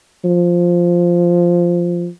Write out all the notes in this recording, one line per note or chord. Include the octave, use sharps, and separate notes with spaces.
F3